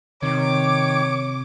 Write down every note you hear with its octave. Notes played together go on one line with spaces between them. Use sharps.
C3 D#3 C#5 D6